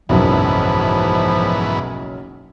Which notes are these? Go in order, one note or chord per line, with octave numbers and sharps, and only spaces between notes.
F#1 B1 G#2 B2 E3 F3